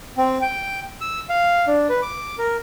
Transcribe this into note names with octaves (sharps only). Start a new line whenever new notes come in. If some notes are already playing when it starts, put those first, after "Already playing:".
C4
G5
E6
F5
D4
B4
D6
A#4